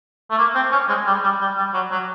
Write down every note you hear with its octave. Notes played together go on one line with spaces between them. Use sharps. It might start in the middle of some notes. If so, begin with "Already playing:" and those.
A3
A#3
C4
C#4
G#3
G3
G3
G3
G3
F#3
F#3